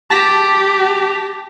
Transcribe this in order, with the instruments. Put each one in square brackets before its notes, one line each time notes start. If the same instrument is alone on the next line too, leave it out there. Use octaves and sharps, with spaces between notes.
[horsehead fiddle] G4 [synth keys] A5 A#6 B6